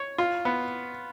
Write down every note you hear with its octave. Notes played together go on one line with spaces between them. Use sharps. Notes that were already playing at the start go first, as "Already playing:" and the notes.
Already playing: C#5
F4
B3